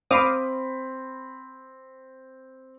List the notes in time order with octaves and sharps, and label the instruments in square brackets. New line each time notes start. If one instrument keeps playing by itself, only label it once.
[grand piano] C4 B5 [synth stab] F5 D6 D#6